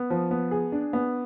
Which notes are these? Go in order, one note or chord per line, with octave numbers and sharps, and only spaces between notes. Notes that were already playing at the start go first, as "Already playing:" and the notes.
Already playing: B3
F3
B3
G#4
D4
B3